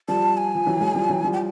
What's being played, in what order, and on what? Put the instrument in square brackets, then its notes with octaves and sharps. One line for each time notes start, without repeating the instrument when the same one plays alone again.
[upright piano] F3 G3 [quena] A5
[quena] G#5
[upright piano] F3
E3 F#3
F#3 G#3
F3 G3
E3 F#3
F3 G3
[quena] G5